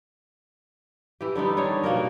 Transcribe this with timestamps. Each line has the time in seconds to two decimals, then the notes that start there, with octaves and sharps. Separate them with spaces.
1.21 E3 G4
1.35 D3 G3 B3 D#4
1.57 D#3 D4 C#5
1.84 B2 A#3 D#4 A#4